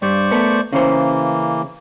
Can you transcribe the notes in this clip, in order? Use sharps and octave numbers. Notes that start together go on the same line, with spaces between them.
G2 C5 D5 C#6
A3 B3
C#3 E3 A#3 C5